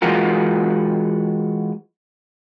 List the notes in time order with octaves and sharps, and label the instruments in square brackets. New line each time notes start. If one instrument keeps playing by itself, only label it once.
[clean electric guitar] E3 G#3 F4 F#4 A#4